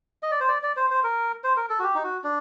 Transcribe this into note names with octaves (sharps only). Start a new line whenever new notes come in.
D#5
D5
C5
D5
D5
C5
C5
A#4
C5
A#4
A4
F#4
G4
D#4
F#4
D4